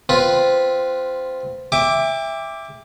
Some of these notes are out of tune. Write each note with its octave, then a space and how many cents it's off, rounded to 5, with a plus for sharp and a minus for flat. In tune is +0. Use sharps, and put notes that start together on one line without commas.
C4 -15 F4 +0 B4 -5
E5 +0 G5 +35 D6 +0